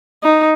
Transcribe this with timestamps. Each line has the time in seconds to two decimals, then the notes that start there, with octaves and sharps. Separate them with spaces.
0.23 D#4